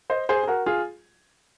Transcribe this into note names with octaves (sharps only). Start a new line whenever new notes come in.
C5 D#5
G#4 C5
G#4
F#4 A#4
F4 G#4